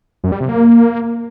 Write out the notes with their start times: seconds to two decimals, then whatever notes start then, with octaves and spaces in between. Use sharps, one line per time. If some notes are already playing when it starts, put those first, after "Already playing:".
0.24 F#2
0.32 G3
0.40 C3
0.49 A#3